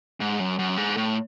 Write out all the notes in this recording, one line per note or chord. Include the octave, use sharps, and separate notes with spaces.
G#2
F#2
F#2
G#2
A2